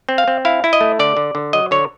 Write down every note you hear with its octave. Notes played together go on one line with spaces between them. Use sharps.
C4
F5
C4
E4 F5
E4
D#5
A3
D3 D5
D3
D3
F#3 D#5
D3 C#5